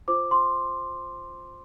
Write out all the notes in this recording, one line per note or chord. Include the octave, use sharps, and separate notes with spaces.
F4 C5 D6
C6